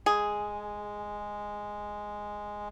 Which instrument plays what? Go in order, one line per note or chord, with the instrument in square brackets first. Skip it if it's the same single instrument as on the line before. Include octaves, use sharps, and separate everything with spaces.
[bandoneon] G#3 [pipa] G#4